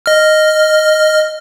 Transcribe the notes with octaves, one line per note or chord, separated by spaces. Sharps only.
D#5 F6